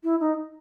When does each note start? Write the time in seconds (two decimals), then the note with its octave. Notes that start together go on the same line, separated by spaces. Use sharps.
0.03 E4
0.20 D#4